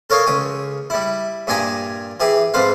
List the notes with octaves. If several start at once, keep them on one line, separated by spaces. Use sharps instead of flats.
A4 A#4 C#5 D#5 F5
C#2 G5 D#6
G3 E4
G2 A#2 G4 G#5 A#5 D#6
E3 G4 G#4
F2 G#2 B4 C5 F5